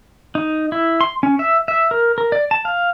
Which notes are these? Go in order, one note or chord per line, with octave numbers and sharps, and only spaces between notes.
D#4
E4
C6
C#4
E5
E5
A#4
A#4
D5
A5
F5